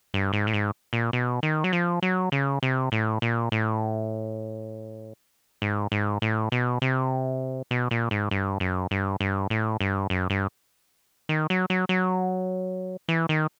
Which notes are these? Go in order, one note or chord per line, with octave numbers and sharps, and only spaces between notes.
G2
G#2
A2
G#2
A#2
B2
D#3
F#3
F3
F#3
C#3
C3
A2
A#2
A2
G#2
G#2
A2
B2
C3
B2
A#2
G#2
G2
F#2
G2
G2
A2
G2
F#2
G2
D#3
F#3
F#3
F#3
E3
D#3